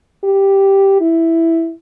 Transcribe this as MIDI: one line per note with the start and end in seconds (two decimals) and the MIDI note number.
0.24 0.98 67
1.01 1.73 64